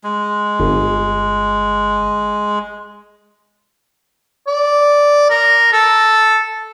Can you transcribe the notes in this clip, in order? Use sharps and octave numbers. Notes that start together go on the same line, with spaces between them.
G#3
G1
D5
A#4
A4